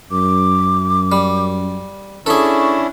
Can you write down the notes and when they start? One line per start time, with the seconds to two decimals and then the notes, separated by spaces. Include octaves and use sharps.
0.11 F#2 D6
1.12 G3
2.26 C#4 D4 E4 G#4 A4 C#6